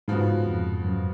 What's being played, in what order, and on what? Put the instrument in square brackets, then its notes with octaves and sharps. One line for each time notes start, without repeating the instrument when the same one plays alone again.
[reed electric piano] G#2 [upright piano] C#3 F3 B3 F#4
[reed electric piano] F2
F#2